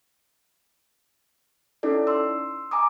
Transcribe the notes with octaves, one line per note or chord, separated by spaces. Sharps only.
C#4 D#4 E4 A4 D5
C6 E6
G#5 A#5 D6 D#6